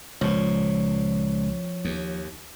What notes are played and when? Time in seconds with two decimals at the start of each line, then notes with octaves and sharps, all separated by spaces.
0.21 C#2 A#2 F3 C#5
1.85 D#2